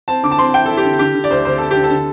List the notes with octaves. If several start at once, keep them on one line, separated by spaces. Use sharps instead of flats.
C4 A5
D3 D6
A5
C4 C6
E4 G5
A4
E4
G4
D3
D3 G4
D3
D5
D2 C5
D2 C5
D2 A4
D3 G4
A4
D3